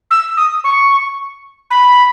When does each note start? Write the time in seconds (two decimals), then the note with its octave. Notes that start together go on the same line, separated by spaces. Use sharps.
0.11 E6
0.37 D#6
0.64 C#6
1.71 B5